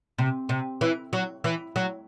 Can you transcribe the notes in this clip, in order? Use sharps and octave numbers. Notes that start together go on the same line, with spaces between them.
C3
C3
E3
F#3
E3
F#3